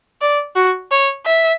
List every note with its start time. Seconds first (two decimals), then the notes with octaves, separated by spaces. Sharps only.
0.21 D5
0.56 F#4
0.91 C#5
1.26 E5